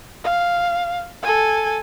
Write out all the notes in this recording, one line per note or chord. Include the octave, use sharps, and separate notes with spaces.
F5
A4 G#5